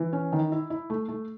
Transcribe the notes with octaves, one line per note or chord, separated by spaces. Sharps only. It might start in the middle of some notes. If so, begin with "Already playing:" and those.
Already playing: E3
C#4
D#3
E4
E4
A3
A3